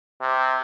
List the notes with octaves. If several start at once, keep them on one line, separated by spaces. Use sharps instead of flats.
C3